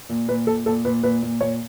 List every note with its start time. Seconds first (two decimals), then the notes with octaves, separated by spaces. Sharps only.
0.09 A#2
0.28 A#2 B4
0.47 A#2 A4
0.66 A#2 A4
0.85 A#2 B4
1.03 A#2 B4
1.22 A#2
1.41 A#2 C#5